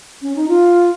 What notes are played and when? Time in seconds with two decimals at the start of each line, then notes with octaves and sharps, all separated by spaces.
0.22 C#4
0.36 D#4
0.48 F4